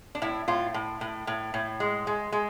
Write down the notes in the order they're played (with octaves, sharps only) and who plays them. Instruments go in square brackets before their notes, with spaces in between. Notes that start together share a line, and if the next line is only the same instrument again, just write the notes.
[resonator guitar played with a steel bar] D4
A2 E4
A2 F4
A2
A2
A2
A2
G#3
G#3
G#3